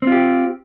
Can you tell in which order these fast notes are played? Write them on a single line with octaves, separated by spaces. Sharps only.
C4 F4 G4